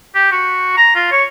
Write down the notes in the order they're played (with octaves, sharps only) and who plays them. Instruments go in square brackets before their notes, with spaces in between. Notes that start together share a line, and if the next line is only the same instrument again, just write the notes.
[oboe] G4
F#4
A#5
F4
C#5